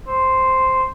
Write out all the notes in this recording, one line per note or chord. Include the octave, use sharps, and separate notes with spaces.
C5